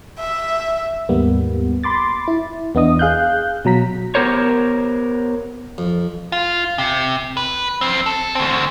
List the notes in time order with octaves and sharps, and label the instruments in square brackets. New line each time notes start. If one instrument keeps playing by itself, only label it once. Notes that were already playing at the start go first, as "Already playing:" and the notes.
[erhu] E5
[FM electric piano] D#2 G#2 G3 A#3 B3
B5 C6 D6 A6
E4
E2 B3 D4 D#5 D#6
G#4 F5 F#6 G6
B2 F#3 A#5 B6
[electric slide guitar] B3 G4 A#4 C5 C#5
[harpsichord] F2
[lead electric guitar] F4
C3
B4
F2 C4
A4
D2 C4